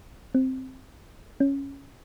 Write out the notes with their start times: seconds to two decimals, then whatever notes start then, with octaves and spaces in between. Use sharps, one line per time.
0.35 C4
1.40 C#4